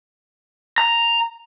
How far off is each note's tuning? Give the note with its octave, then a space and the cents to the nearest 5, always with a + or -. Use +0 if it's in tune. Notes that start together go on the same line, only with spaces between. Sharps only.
A#5 +0